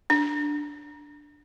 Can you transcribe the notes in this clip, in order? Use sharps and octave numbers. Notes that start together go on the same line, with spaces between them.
D4